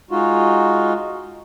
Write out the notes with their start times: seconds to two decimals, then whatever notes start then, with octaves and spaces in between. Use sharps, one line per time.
0.11 G#3 D#4 F4 F#4